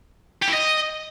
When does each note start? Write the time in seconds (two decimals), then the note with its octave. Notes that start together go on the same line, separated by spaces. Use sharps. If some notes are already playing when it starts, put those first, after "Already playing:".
0.42 G4
0.47 E4
0.53 D#5